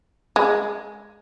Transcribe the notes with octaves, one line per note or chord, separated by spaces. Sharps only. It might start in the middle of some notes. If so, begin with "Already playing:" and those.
G#3